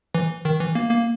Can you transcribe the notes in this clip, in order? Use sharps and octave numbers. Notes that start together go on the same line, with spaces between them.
E3
D#3
E3
A#3
A#3